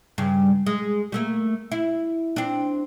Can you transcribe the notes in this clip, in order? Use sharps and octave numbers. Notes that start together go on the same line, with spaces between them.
G2 C#3
G#3
G3 A3 A#3
E4
C4 D4